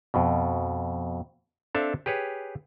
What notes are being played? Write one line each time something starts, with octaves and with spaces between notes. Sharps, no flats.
F2 B2
C4 D4 A4 E5 F5
G4 G#4 B4 C#5